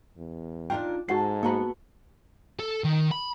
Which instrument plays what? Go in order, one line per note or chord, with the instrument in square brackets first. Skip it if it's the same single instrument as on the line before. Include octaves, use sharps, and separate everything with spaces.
[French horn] E2
[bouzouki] A#2 D3 A#4 [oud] D4 D#4 F4 [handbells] G5
[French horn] G#2 [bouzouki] G#3 A4 [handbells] F#4 F#5 C7 [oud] C5
[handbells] A#3 A#5 [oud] B3 F#4 B4
[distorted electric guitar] A4
D#3
B5